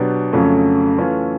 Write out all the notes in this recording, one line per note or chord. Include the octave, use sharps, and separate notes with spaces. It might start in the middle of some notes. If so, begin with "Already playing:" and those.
Already playing: B2 F#3 B3 D4 G4
F2 C#3 F#3 A3 C#4
E3 A3 C#4 F4